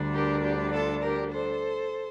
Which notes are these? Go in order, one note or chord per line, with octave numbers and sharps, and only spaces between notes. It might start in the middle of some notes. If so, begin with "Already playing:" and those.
Already playing: D2 D3 G3 D4
G4 A#4
G4
F4 A4
G4 A#4
A4 C5